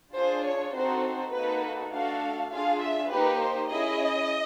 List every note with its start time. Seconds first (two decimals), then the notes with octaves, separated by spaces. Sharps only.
0.14 D4 F4 G#4 C5
0.44 C#5
0.73 C4 D#4 F#4 A4 C5
1.04 C5
1.33 A#3 D#4 F#4 A4 B4
1.92 A3 D4 F#4 A4 F5
2.51 D4 F4 G#4 F5
2.81 E5
3.11 A#3 D#4 G4 B4
3.41 C5
3.70 C#4 E4 G#4 D#5